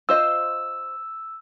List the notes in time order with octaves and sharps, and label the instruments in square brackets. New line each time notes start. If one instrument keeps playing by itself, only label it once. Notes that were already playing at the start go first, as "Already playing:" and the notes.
[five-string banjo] F4 C5 D#5 [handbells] E6